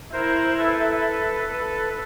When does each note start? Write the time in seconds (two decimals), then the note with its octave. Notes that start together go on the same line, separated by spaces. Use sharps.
0.13 E4 A#4 C5
0.58 A4 B4
1.48 A4 B4